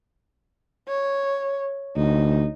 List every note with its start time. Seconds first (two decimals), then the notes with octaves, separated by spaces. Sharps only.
0.88 C#5
1.97 D2 D#4